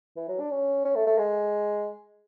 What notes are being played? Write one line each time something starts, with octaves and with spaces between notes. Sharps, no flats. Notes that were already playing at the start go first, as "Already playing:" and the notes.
E3
F#3
D4
C#4
C#4
A3
A3
G#3